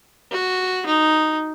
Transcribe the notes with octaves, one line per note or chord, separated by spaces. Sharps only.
F#4
D#4